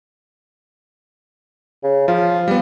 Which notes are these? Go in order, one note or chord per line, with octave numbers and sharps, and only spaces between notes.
C#3
F3 F4
G3 B3